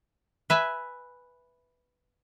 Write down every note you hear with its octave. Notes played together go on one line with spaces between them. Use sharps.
B4 E5 G#5